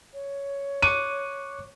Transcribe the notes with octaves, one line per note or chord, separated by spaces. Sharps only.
C#5
C#6 D6 F#6 D#7